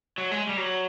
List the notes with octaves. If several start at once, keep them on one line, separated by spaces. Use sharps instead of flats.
F#3
G#3
G3
F#3